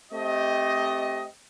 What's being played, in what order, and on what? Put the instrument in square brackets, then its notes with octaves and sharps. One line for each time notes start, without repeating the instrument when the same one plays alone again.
[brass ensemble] A3 C4 G4 D#5